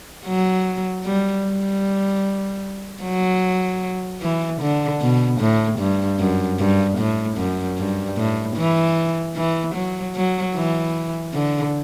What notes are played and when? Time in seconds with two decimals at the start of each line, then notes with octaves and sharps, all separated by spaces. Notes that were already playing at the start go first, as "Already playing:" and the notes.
0.26 F#3
1.05 G3
1.44 G3
3.03 F#3
4.21 E3
4.61 D3
5.01 B2
5.40 A2
5.79 G2
6.19 F#2
6.59 G2
6.98 A2
7.37 F#2
7.77 G2
8.17 A2
8.56 E3
9.36 E3
9.75 F#3
10.15 F#3
10.55 E3
11.34 D3